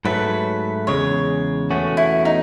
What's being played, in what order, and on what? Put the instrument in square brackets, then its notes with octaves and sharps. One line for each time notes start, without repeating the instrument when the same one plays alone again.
[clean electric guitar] G#2 F#3 A3 [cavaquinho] B4
[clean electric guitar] E2 C#3 G#3 [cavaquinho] C#5
[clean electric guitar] E2 B2 A3 C#4 F#4
[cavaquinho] E4
D#4